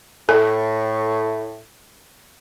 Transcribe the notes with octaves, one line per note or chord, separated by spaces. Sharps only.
A2 A4